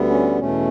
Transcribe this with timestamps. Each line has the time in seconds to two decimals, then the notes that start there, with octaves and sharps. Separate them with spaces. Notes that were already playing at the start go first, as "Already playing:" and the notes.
Already playing: D2 D3 G3 B3
0.10 C#4
0.39 E2 B2 A3 C#4